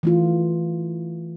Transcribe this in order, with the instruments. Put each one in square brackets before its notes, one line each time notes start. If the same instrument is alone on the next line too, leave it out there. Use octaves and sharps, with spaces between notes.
[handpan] E3 A3 F4